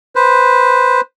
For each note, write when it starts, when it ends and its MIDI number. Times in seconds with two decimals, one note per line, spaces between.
0.15 1.01 71
0.15 1.01 72